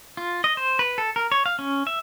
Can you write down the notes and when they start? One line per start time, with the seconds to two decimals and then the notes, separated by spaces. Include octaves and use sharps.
0.17 F4
0.44 D#5
0.57 C5
0.79 B4
0.98 A4
1.16 A#4
1.32 C#5
1.46 F5
1.59 C#4
1.87 E5